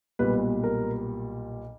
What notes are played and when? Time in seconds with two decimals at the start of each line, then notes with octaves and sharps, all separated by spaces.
0.19 B1 A#2 G3 B4
0.64 A#4